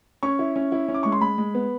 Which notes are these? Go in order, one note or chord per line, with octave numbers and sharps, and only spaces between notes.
C#4 C#6
E4
C#4
E4
C#4
D6
G#3 C#6
C6
G#3 B5
G#3
B3